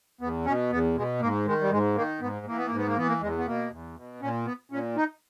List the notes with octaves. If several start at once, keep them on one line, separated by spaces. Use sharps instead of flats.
E2 B3
B2 C#4
E2 B3
B2 G#3
G#2 A#3
D#3 G#3
G3
G#2 G#3
D#3 A#3
G#2 B3
E3 A#3
B3
G#2 A#3
B3
A#3
E3 B3
A#3
E2 G#3
B3
B2 A#3
E2
B2
A#2 C#4
B3
A#2 C#4
D#4